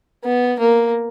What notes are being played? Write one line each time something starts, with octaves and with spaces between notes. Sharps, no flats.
B3
A#3